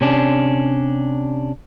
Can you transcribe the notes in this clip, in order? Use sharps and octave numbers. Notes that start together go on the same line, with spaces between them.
C3 C#4 D4